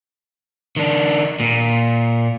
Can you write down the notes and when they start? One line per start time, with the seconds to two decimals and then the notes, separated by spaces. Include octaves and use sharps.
0.77 D#3 D4
1.40 A#2